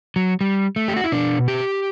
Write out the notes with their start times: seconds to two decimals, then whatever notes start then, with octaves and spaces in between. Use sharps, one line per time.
0.16 F#3
0.41 G3
0.76 A3
0.88 G4
0.96 F#4
1.04 E4
1.12 B2 D4
1.48 G4